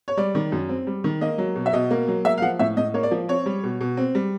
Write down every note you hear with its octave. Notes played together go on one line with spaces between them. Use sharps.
C#5
G3 D5
D#3
F#2
C4
G3
D#3
A#3 D#5
F#3
B2
E5
B2 D#5
A#3
F#3
A#3 E5
F5
F3 F#5
A2 E5
A2 D#5
A#3 C#5
D5
F3
C4 C#5
G3
B2
B2
C4
G3